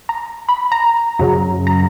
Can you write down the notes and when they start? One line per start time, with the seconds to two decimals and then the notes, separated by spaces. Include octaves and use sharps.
0.09 A#5
0.49 B5
0.72 A#5
1.19 F#2 C#3 F#3
1.67 A#5